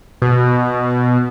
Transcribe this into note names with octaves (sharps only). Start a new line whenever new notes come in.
B2